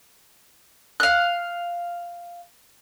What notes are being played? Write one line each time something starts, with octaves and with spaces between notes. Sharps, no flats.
F5 F#6